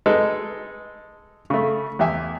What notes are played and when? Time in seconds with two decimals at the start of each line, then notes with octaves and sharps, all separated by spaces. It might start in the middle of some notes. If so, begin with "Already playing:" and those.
0.06 G#3 D#4 A4 B4
1.50 C#3 A3
1.99 E2 G4 E5 G#5